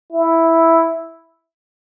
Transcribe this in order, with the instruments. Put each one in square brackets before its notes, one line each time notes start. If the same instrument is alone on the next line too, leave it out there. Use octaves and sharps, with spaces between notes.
[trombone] E4